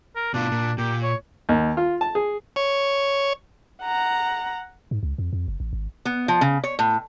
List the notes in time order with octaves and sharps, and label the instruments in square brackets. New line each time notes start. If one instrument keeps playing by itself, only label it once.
[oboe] A#4
[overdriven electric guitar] B2 F4 [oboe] D4
[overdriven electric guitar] A#2
[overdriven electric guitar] A#2 [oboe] G4
[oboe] C#5
[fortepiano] D#2
F4
A5
G#4
[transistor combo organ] C#5
[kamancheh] F#5 A#5
[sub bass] G#2
C#2
F2
F2
F#1
A1
G#1
[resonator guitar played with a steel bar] B3
F3
C#3
C#5
A2